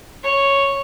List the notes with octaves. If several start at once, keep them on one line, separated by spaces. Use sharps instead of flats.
C#5